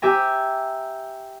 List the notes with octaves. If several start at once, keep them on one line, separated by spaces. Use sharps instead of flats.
G4 E5 G#5 A#5